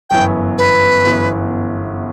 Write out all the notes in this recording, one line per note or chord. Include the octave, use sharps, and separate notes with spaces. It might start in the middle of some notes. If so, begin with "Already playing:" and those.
G1 F#2 E3 B3 G5
B4
G1 F#2 E3 B3